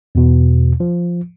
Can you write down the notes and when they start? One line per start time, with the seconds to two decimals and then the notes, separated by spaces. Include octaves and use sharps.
0.15 E2 B2
0.80 F3